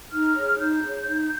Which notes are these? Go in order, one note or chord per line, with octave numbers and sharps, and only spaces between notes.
D#4 F6
G#4 C#5
D#4 G6
G#4 C#5
D#4